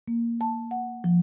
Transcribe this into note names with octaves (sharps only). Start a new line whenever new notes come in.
A#3
A5
F#5
F3